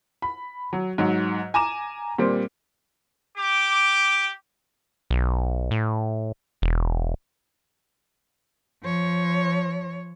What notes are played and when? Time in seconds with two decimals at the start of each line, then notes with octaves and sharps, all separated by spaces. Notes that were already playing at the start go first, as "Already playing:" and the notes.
0.22 B5
0.73 F#3
0.98 G#2 F#3
1.54 G#5 A#5 D6 E7
2.18 A#2 G3 C4
3.37 G4 D6
5.11 B1
5.71 A2
6.62 E1
8.83 F3 C#5